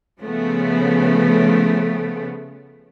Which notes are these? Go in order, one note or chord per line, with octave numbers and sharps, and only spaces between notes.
C#3 F3 A3 B3